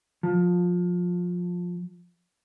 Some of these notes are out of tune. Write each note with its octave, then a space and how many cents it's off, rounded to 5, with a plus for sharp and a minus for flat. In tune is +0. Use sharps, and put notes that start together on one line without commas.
F3 +20